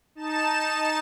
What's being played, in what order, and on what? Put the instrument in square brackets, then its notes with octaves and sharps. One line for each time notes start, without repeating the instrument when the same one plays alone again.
[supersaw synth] D#4 A5 E7